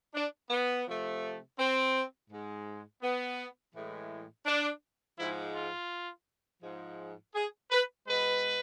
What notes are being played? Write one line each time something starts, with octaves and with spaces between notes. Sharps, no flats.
D4
B3
C3 F3 A3
C4
G#2 G#3
B3
A2 E3 G#3
D4
G#2 F3 G#3 E4
F4
G#2 F3 G#3
G#4
B4
B2 G#3 B4